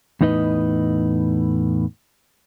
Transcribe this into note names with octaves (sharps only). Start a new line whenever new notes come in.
E2 A2 D#4 B4 D#5